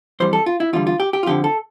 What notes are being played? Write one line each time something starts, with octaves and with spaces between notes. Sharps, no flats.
F2 E3 G3 C5
A4
F4
E4
E2 D3 G3 F4
F4
G4
G4
F4
F2 D3 F3 G4
A4